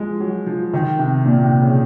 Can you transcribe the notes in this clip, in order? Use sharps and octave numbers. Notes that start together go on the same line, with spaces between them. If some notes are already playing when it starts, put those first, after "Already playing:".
Already playing: F3 G#3
F#3
F3
D#3
C3
A#2
C3
C#3